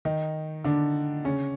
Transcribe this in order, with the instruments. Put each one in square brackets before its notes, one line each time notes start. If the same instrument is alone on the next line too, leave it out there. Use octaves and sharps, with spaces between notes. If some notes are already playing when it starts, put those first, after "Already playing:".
[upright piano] D#3 D#4
D3 D4
C#3 C#4